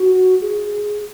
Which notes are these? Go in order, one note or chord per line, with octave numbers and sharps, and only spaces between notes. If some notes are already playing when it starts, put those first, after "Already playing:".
Already playing: F#4
G#4